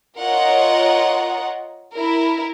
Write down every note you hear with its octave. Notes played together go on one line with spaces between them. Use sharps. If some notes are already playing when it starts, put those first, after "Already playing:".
F4 A#4 C#5 D#5 F#5
E4 A#4